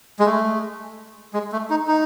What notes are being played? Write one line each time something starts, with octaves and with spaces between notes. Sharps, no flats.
G#3
A3
G#3
A3
D#4
D#4